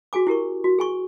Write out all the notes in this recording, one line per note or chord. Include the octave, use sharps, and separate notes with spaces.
F#4 G#4 G#5 D6
E4 G4 A#4 C#6
F#4
G#4 G#5 C#6